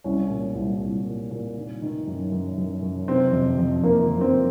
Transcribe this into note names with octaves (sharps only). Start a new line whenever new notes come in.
C2 C#4
A#2
C2
C2
A#2
A#2
D#3
D#3
F#2
F#2
F#2
F#2
C3 C4
F2
F2
F2 A#3
F2
C4